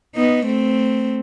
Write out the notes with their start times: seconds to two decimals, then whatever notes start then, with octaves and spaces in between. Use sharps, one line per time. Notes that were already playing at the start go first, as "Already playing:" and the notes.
0.16 B3 D#4
0.45 A3 C4